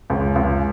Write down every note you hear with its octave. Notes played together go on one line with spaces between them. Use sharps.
C#2
C#2